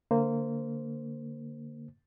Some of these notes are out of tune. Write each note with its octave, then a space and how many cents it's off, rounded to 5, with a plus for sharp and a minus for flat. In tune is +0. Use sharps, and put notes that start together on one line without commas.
D3 -15 A#3 -20 C5 -5